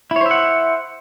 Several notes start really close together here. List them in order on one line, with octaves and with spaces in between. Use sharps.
E4 C#5 C5 E5 F#5